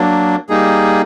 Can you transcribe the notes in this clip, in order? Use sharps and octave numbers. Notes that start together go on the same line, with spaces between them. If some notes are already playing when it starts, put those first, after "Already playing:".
Already playing: F#3 A#3 D4
G3 A#3 D#4 G#4